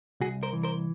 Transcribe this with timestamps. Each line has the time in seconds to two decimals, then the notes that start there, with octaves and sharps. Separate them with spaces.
0.21 C2 F#4 G#4
0.43 A#4 C5
0.53 E3
0.63 A#4 C5